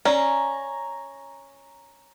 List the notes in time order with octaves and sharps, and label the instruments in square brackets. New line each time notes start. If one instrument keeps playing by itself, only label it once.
[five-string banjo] C#4 [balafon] D5 [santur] A#5